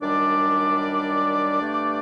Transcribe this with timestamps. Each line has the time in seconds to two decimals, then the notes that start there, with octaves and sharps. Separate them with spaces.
0.01 F#2 D#3 G3 D4 D5
1.60 G2 D3 A3